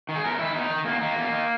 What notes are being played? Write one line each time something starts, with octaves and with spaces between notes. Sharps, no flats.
D#3
G#4
E2 A#4
D#3 E4
E2 D#4
D#3
E2 A#3
D#3 A#3
E2
D#3